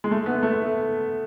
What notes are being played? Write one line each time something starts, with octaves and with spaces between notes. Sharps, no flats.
G#3
A3
B3
A3